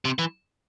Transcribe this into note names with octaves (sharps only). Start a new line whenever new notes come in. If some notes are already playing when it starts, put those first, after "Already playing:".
C3
E3